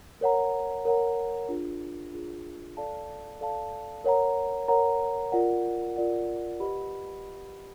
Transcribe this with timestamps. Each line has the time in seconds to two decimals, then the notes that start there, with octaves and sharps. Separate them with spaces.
0.21 A#4 C#5 F#5 A#5
0.85 A#4 C#5 F#5 A#5
1.49 D4 F4 G#4
2.13 D4 F4 G#4
2.77 A4 D5 F5 A5
3.41 A4 D5 F5 A5
4.04 A#4 C#5 F#5 A#5
4.68 A#4 C#5 F#5 A#5
5.32 F4 A#4 D5 F#5
5.96 F4 A#4 D5 F#5
6.60 G4 B4 D#5 F#5 B5